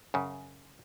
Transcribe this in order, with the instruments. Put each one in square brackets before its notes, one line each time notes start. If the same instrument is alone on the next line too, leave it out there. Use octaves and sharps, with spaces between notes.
[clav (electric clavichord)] F#2 C#3